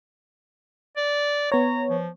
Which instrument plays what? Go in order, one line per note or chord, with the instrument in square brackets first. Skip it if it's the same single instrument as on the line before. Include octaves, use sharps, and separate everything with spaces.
[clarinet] D5
[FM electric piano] B3 C#5 [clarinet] A#5
[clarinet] F3